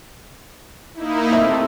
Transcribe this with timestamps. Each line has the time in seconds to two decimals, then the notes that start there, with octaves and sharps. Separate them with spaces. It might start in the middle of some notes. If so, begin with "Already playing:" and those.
0.94 A#3 D#4 E4
1.33 C3 A3 E5